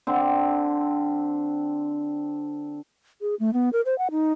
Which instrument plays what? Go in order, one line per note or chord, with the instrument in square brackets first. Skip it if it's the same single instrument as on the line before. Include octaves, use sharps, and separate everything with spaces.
[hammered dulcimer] D3 C4
[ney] G#4
A3
B3
A#4
C5
F#5
D#4